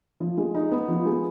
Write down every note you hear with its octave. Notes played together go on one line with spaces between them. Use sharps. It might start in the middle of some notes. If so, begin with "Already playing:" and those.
F3
G#3
D#4
B3
F3
G#3